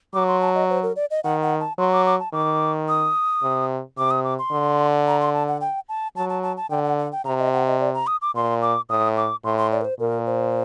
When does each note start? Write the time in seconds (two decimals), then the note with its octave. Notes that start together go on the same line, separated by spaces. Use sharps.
0.14 F#3 D6
0.28 C6
0.41 A5
0.55 D#5
0.70 C5
0.83 A#4
0.96 D5
1.11 D#5
1.24 D#3 F#5
1.42 F#5
1.60 A5
1.78 F#3 C6
1.92 D6
2.06 D6
2.20 A5
2.33 D#3 D6
2.88 D#6
3.42 C3
3.98 C3 D6
4.11 D#6
4.24 D6
4.39 C6
4.51 D3
5.07 A#5
5.20 C6
5.34 A5
5.48 F#5
5.61 G5
5.89 A5
6.16 F#3 A5
6.29 A5
6.43 A5
6.57 A5
6.70 D3 G5
6.84 F#5
6.99 F#5
7.12 G5
7.25 C3 A#5
7.39 D#5
7.53 F#5
7.67 D#5
7.80 D5
7.94 A#5
8.07 D#6
8.22 D6
8.35 A#2 C6
8.62 D6
8.89 A2 D#6
9.17 D6
9.44 A2 C6
9.57 C6
9.72 D5
9.81 A#4
9.85 C5
10.00 A#2 A#4
10.26 C5